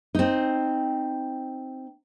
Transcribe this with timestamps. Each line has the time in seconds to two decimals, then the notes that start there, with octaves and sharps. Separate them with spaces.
0.15 C4 D#4